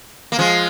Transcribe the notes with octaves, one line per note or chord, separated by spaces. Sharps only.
A#3
F3 G#3